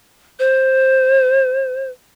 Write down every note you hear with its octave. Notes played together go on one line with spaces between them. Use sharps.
C5